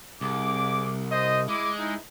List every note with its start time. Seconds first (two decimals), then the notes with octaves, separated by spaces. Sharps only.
0.21 C2 G#4 D6
1.12 C5 D#5
1.48 G#3 E4 D6
1.78 D#4 E4